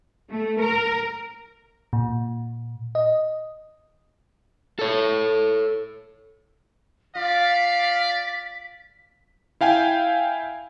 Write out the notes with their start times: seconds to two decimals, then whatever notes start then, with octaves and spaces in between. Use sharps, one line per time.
0.31 A3
0.60 A#4
1.93 A#2
2.95 D#5
4.79 A4 C#5
7.15 F4 D5 F5 B6
9.61 E4 F5 G5 G#5